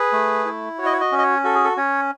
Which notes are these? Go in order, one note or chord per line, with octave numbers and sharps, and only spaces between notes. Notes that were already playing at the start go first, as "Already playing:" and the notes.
Already playing: G#4 B4
A3
E4
F#4 C#5
D#5
C#5
D#5
C#4
D#5
C#5
F#4 A4
G#4
A4
C#4 C#5